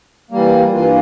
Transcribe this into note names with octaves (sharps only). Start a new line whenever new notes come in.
E3 G3 A#3
G2 E3 A#3 F4